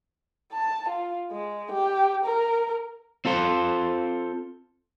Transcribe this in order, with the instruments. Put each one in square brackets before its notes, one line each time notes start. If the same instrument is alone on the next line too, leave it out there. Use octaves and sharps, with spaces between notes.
[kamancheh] A5
F4
G#3
G4
A#4
[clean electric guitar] C4 F4 A4 C5